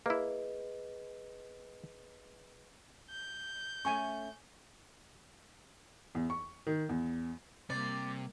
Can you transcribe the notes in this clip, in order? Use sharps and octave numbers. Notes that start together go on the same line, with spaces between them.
A#3 E4 G#4 B4 D#5
G6
A3 C#4 G#5 C#6
E2
C#6
D#3
E2
C3 G3 A#3 D5